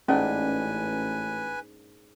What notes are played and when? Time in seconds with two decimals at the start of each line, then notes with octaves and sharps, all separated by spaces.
0.08 A1 G#2 A#3 C#4 D4 B4 G#5